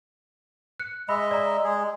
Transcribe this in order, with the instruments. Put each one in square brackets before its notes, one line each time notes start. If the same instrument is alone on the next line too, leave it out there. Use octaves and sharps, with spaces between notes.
[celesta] F#6 C#7
[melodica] G#3 D#5 E5 [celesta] B5
[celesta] D5 A#5
[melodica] G#3 G#4